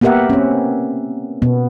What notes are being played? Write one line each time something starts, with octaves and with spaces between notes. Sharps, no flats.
A#3 B3 G4 A#4 E5 F#5
C4 C#4
B2 B3